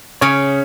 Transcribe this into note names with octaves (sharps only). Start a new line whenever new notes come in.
C#3 C#4 C#5